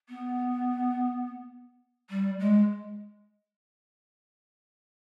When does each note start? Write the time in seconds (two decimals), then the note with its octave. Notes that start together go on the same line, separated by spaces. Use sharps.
0.09 B3
2.10 G3
2.39 G#3